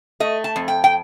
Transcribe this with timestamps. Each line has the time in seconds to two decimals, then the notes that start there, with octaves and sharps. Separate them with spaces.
0.20 A3 D#5
0.44 A5
0.56 F2
0.68 G5
0.84 G5